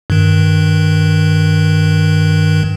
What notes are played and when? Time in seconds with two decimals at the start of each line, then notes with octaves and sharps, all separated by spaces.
0.10 G2 D#3